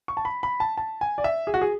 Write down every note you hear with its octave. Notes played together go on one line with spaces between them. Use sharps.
C#6
A5
B5
B5
A5
A5
G#5
D5
E5
G#4
F#4
G#4